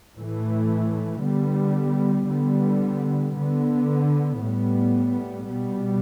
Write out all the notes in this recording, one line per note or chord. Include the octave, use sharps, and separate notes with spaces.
A2 E3 A3
D3 G3 B3
D3 G3 B3
D3 B3
A2 G3 B3
B2 G3 B3